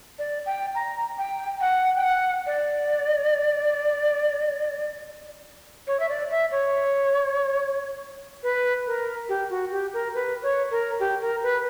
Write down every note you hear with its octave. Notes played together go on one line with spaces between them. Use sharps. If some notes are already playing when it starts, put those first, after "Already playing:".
D5
G5
A#5
G5
F#5
G5
F#5
D5
C#5
E5
D5
E5
C#5
B4
A#4
G4
F#4
G4
A#4
B4
C#5
A#4
G4
A#4
B4